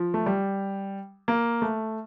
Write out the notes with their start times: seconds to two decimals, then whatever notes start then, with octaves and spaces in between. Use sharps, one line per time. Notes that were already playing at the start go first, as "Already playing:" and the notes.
Already playing: F3
0.14 A3
0.26 G3
1.28 A#3
1.62 A3